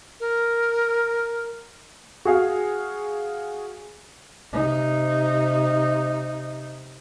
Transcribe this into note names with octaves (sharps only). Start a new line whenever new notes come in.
A#4
F#4 G#4 F5
C3 D#4